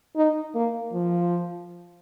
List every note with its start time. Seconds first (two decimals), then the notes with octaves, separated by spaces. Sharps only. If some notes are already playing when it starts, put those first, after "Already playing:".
0.16 D#4
0.55 A#3
0.93 F3